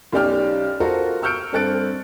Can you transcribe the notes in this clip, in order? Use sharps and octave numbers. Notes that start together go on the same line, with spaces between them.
B1 C#4 G4 D5 G5 F6
F4 F#4 A4 A#4 C5
C#6 E6 F6 G6 C#7 D7
G2 C4 A4 F#6 A6 D7